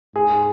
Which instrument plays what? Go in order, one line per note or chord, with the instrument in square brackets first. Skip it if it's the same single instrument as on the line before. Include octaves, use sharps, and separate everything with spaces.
[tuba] G#2 [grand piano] G#4